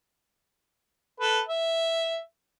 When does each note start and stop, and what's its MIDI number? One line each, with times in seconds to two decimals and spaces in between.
1.20 1.40 69
1.20 1.40 71
1.48 2.18 76